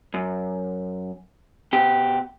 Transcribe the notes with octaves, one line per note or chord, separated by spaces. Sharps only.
F#2
B2 G4